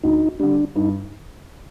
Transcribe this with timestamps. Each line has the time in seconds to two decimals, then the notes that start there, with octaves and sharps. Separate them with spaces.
0.03 D2 D#4
0.40 D3 G3 D4
0.75 G2 D#4